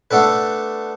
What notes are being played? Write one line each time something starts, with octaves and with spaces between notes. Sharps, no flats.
A3 B3 D4 A4 B4